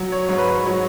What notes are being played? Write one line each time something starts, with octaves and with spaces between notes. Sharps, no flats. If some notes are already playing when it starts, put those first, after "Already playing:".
Already playing: F#3
C#5
G#2 C#5
B4
C#5
F#3 C#5